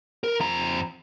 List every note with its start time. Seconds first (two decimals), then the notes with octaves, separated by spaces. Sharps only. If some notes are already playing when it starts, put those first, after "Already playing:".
0.24 A#4
0.40 F2 A#5